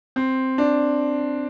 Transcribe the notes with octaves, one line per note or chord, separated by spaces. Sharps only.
C4
D4